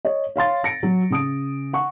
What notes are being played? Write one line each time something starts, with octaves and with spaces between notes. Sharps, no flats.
C#5 D#5
C#5 F5 C6 A6
A#6 C#7 D7
F#3
C#3 D#6 D7
F#5 C#6